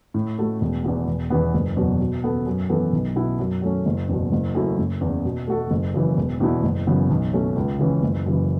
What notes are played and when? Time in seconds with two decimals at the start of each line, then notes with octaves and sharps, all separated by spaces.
0.14 A2
0.38 A3 F#4 A4
0.61 E1
0.84 E2 E3 B3
1.07 E1
1.30 E2 E3 B3
1.54 F#1
1.77 E2 B2 F#3
2.00 B2
2.24 B3 A4
2.47 F#2
2.69 E3 B3 A4
2.93 B1
3.16 B2 B3 E4
3.39 F#2
3.62 F#3 A3 C#4
3.86 F#1
4.09 E2 B2
4.32 F#1
4.55 F#2 F#3 A3 E4
4.78 F#1
5.01 E2 C#3
5.25 B2
5.47 A3 F#4 A4
5.70 F#1
5.94 F#2 C#3 E3
6.17 E1
6.40 E2 B2 B3 E4
6.63 F#1
6.87 F#2 C#3 E3 B3
7.10 B1
7.33 B2 A3 C#4
7.56 C#2
7.79 C#3 E3 C#4
8.03 F#1
8.26 F#2 C#3 E3